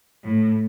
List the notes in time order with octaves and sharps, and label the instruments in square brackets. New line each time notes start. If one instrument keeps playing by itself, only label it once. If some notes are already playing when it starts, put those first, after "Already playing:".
[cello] A2